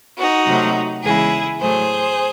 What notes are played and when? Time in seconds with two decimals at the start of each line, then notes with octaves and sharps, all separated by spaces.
0.17 D#4 F#4
0.46 C3 F#3 A3
1.03 E2 C#3 G#3 E4 G#4
1.60 A2 F#3 A3 G#4 C5